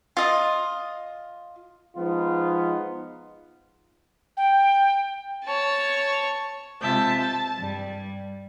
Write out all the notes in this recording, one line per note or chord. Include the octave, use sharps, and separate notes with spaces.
F4 D#5
F3 G#3 B3 D#4 F4
G5
C#5 A5
C3 G#3 F4 E5 A5 G6
A5
G2 G3